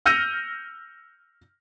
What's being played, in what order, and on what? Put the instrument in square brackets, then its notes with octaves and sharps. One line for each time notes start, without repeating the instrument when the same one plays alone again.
[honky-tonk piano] E6 F6 G6 A#6 C#7 D#7